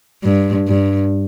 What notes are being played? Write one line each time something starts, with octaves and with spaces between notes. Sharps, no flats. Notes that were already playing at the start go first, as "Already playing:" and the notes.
G2
G2